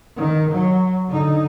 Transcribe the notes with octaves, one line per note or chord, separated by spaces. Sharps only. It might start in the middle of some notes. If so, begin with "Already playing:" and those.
D#3
F#3
D3 D#4